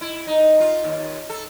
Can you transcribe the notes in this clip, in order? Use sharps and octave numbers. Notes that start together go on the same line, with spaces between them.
E4
D#4
F4
D#2
A4